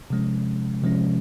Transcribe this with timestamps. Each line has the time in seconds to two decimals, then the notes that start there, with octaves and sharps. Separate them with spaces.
0.10 C3 F3 G#3 C#4
0.82 C3 F3 G#3 C#4